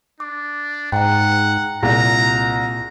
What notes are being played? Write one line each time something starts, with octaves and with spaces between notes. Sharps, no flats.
D4 D6
G#2 F#5 G5 A#5
C2 A#2 G#4 A#5